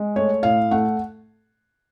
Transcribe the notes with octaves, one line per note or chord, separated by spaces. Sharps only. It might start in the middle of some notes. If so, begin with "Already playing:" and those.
Already playing: G#3
A3 C#5
A2 F5
A3 F#5